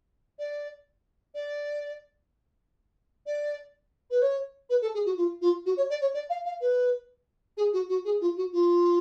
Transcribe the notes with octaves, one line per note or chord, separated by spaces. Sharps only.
D5
D5
D5
B4
C#5
B4
A4
G#4
F#4
F4
F4
F#4
C#5
D5
C#5
D5
F5
F5
B4
G#4
F#4
F#4
G#4
F4
F#4
F4